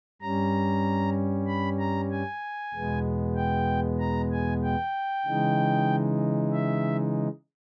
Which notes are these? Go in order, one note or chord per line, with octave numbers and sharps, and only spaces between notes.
G2 G3 C#4 A#5
B5
A#5
G#5
E2 B2 G#3 B3
G5
A#5
G#5
G5
C#3 E3 G#3 D#4
E5